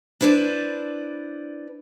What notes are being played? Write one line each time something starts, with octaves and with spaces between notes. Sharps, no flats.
D4 E4 B4 C5 D5